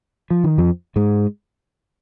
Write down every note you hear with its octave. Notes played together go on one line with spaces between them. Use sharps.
F3
D#3
F2 F3
G#2 G#3